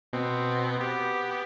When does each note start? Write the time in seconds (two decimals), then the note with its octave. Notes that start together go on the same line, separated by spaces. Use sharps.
0.13 B2 B3 C4
0.80 B3 G4